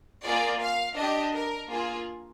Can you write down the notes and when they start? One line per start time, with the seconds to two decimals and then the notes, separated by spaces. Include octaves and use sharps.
0.25 A#3 F4 G#4 D5
0.61 F5
0.97 D4 G4 D#5
1.34 A#4
1.70 A#3 F4 G#4